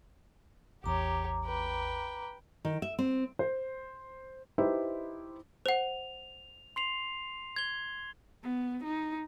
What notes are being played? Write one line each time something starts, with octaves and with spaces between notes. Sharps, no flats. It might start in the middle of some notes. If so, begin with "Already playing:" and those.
A1 E2 G4 C#5 A#5 D6
B4 G5
D#3
E5
C4
C5
D#4 E4 G4 B4 C5 E5
C5 F#5 F7
C6 C7 F7
G#6 G7
B3
D#4